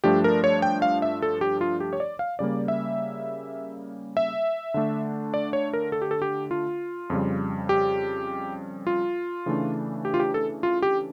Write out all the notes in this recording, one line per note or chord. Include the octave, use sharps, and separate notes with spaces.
G2 F3 A3 D4 G4
A#4
C#5
G5
F5
E5
A4
G4
F4
G4
C#5
D5
F5
C#3 G3 A#3 D5
E5
E5
D3 A3 D4
D5
C#5
A#4
A4
G4
A4
G4
F4
F2 C#3 G3
G4
F4
C#3 E3 A3 D4
G4
F4
G4
A4
F4
G4